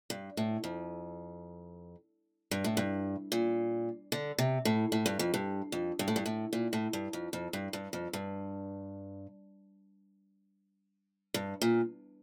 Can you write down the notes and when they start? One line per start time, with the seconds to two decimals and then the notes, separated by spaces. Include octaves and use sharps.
0.10 G2
0.37 A2
0.64 F2
2.51 G2
2.64 A2
2.77 G2
3.32 A#2
4.12 D3
4.38 C3
4.65 A2
4.92 A2
5.06 G2
5.19 F2
5.34 G2
5.72 F2
5.99 G2
6.08 A2
6.16 G2
6.26 A2
6.53 A#2
6.73 A2
6.93 G2
7.13 F2
7.33 F2
7.53 G2
7.73 G2
7.93 F2
8.13 G2
11.34 G2
11.62 A#2